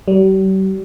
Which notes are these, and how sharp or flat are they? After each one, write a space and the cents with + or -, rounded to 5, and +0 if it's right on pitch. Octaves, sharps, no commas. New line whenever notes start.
G3 -40